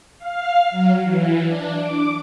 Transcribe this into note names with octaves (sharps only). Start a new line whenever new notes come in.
F5
F#3
E3
D4
D6